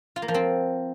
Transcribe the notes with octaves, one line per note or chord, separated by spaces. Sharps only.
F4
A#3
F3
C4